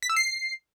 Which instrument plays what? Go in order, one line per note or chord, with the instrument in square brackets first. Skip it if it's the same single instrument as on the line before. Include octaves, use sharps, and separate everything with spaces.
[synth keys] B6
E6
C7